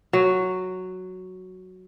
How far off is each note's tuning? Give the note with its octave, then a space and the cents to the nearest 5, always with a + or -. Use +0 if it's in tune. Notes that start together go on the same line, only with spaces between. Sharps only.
F#3 +0